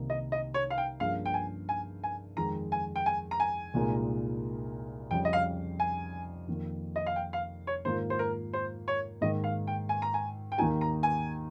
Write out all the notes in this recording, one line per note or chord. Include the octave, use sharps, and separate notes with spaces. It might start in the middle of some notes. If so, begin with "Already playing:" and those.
Already playing: C2 C3 D#3 A#3 D#4
D#5
D#5
C#5
F5
G5
G2 F3 A#3 C#4 G#4 F5
G5
G#5
G#5
G#5
F2 D#3 G#3 A#5
G#5
G5
G#5
A#5
G#5
C2 A#2 G#3 D#4 A#4
F2 C#3 G3 C#4 G5
D#5
F5
G#5
F2 D#3 A#3
D#5
F5
G5
F5
C#5
G#2 D#3 A#3 F4 C5
C5
A#4
C5
C#5
G#2 D#3 A#3 D#5
F5
G5
G#5
A#5
G#5
G5
D#2 D#3 A#3 D#4 G4 G#5
A#5
G#5